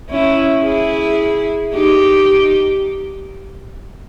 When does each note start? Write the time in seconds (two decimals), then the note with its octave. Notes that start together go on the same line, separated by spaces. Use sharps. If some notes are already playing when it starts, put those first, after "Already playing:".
0.10 C#4 E4
0.64 E4 G#4
1.74 D#4 G4